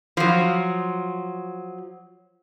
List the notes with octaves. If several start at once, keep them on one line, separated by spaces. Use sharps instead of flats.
F3 F#3